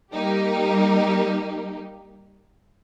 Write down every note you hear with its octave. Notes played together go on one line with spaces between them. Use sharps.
G3 A#3 D#4 G4